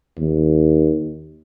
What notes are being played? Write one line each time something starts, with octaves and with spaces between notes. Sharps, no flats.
D#2